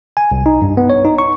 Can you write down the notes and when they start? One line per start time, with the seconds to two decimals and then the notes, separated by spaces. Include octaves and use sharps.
0.17 G#5
0.31 C2
0.46 D#4
0.62 G2
0.77 B3
0.90 C#5
1.05 D#4
1.18 C#6